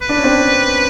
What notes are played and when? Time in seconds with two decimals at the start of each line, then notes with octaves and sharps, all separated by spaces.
0.02 B4
0.09 D4
0.17 C#4
0.24 C4 D4